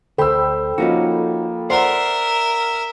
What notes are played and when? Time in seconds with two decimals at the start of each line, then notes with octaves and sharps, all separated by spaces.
0.18 D2 A4 C5 G5 B5 E6
0.78 F3 A#3 C#4 D#4 F#4
1.70 A#4 C5 D5 E5 F#5 C6